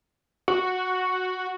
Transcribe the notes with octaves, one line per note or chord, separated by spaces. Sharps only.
F#4